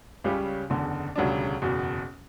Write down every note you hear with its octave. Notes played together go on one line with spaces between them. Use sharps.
C#2 C#3 G3 C#4 G4
F#1 E2 D3
E1 D2 C#3 G3 D4
F#1 E2 B2